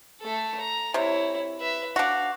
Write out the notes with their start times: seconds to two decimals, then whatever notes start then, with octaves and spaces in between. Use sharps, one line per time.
0.21 A3 A4
0.60 A#5
0.94 C3 E4 C#5
1.59 B4 E5
1.96 D4 F#4 F5